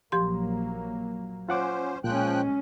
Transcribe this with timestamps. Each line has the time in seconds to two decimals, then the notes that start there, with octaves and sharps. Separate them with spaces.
0.12 A#1 F3 F#3 A#3 G4 C6
1.49 C#4 F4 C5 F#5 D6
2.04 A#2 F3 G#3 C#4 G5 F#6